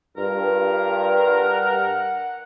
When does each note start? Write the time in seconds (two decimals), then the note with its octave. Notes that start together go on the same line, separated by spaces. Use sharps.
0.17 G2 F4 A#4
1.26 F#5